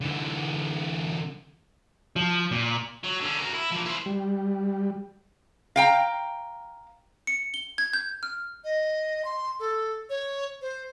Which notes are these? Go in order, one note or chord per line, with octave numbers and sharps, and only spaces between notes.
D3 E3
F3
A#2
F#3
D3 C#4
F#4 A#4
E4
F3 A#3
E4 C5
G3
F5 G5 A#5
C#7
G7
G#6
G6
F6
D#5
C6
A4
C#5
C5